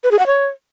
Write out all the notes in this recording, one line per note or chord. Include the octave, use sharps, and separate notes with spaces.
B4
G#4
F#5
C#5